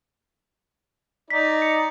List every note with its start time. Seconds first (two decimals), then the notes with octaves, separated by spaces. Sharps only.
1.30 D#4 D5 B6
1.62 C#7